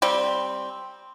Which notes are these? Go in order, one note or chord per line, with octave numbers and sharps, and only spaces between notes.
G3 C4